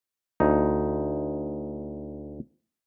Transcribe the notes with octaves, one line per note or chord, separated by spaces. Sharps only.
D2 D#4